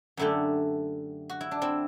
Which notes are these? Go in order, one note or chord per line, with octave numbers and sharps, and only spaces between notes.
F#2 D3 A3 E4 G4
F#4
E4
D4
C4 E4